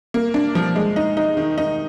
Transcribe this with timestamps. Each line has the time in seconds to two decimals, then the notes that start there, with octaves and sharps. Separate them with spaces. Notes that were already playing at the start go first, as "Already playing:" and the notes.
0.14 A#3
0.34 D4
0.55 F3
0.76 G#3
0.96 D#4
1.17 D#4
1.37 D#3
1.58 D#4